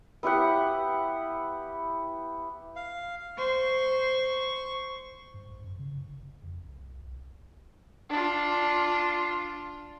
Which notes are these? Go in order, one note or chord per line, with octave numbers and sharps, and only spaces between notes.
B3 E4 G4 F#5
F5
C5 C#6
G2
A1
F#2
C#3
D#1
G1
F2
C2
B1
D4 F4